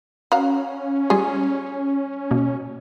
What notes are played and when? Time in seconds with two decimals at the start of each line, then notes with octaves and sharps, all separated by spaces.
0.32 C#4 F#4 F5 A#5
1.10 G3 F4 G4 G#4
2.31 B2 A#3